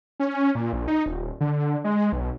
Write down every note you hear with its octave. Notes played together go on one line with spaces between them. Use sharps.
C#4
A#2
A#1
D#4
D#1
D3
G#3
B1